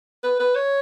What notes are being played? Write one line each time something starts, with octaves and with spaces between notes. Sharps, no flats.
B4
B4
C#5